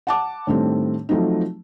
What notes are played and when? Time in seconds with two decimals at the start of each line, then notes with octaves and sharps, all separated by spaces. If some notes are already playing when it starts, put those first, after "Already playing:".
0.07 F#5 A5 D6
0.47 A2 D#3 G3 A3 C4 D4
1.09 F3 F#3 A3 C4 D#4